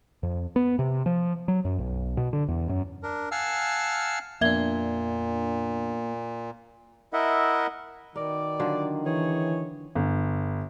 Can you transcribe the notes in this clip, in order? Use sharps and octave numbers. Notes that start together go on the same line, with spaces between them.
F2
B3
C3
F3
F#3
F#2
B1
B2
D3
E2
F#2
D4 A#4
F5 F#5 G#5 A5 E6 F6
F2 A#2 A#3 B3 D4 E5 G#6 G7
E4 A#4 D#5 E5 F#5
B2 D#3 A#4 D5
D3 F#3 F4
E3 G#4 C#5
G1